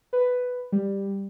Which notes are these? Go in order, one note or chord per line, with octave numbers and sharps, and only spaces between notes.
B4
G3